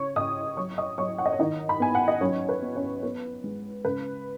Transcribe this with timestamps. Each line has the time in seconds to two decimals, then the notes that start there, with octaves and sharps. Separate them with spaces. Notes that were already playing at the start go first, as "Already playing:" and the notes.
Already playing: C#3 C#5 C#6
0.16 C#3 D#5 D#6
0.57 F#3 C#5 C#6
0.78 D#5 D#6
0.98 F#3 C#5 C#6
1.18 F#5
1.26 D#5
1.32 C#5
1.39 D#3 D#4 D#5
1.69 B5
1.80 B3 G#5
1.95 F#5
2.08 D#5
2.21 F#3 C#4 C#5
2.49 B4
2.62 B3
2.76 C#4 C#5
3.03 B3 B4
3.44 G#3
3.85 C#3 B4